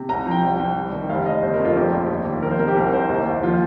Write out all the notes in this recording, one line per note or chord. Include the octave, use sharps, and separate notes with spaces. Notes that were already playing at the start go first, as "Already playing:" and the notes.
Already playing: C3
C2 A#5
F3
G5
C2
C2
G3
D#3
F1 F5
F1 D#5
G1 C5
A#4
F2
F4
A#1 G4
A#1
D#2
D#3
F3 A#4
C5
C3 A#4
G4
C2 A#4
C2 C5
D#2 G4
D#2
F3 F4